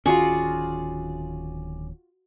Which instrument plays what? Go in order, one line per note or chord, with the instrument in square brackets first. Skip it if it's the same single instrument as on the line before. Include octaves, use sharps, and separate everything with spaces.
[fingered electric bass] D1 D#3 C#4 [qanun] F4 F#4 C#6 [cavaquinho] G#4 D5